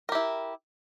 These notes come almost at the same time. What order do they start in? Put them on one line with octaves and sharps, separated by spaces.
A#4 G4 E4